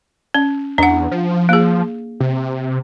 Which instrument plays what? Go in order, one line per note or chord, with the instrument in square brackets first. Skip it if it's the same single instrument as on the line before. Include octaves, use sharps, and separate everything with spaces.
[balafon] C#4
[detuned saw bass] E2 [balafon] D4 F#5
[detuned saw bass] F3
[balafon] A#3 G#4
[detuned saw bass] C3